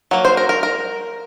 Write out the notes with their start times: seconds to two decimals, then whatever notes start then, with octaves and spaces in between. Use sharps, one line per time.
0.11 F#3 A#3
0.25 C5
0.37 A#4
0.49 A#4
0.63 A#4